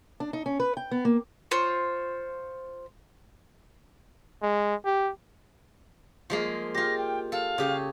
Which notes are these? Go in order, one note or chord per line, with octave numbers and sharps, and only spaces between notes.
D4
D#4
C#4
B4
G5
B3
A#3
F4 C5 C#5
G#3
G4
F3 G#3 A#3
F4 G4 A#6
G5
A4 F5
C#3 G4